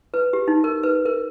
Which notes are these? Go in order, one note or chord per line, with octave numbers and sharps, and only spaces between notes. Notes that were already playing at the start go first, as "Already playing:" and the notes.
B4
G4
D#4
A#4
B4
A#4